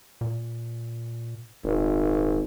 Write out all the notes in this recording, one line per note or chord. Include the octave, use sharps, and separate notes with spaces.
A#2
D#1 G#1